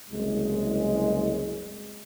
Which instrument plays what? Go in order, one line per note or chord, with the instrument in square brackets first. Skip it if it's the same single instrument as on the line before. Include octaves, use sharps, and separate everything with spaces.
[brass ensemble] F#1 C2 G#3